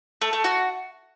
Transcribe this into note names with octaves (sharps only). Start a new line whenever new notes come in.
A3
A3
F#4